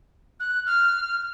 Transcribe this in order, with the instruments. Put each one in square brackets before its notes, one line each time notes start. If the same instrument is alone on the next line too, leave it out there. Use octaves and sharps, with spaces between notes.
[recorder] F#6
F6